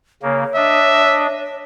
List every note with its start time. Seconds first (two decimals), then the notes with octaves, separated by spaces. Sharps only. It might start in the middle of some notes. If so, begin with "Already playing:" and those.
0.23 C#3 A#3 C#5
0.56 D4 D#5 E5